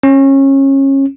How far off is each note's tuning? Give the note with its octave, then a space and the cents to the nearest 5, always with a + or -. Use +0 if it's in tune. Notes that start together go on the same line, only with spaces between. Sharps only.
C#4 -25